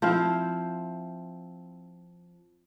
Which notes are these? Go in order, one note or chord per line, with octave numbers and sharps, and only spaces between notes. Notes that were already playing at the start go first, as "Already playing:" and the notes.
F3 C4 E4 F5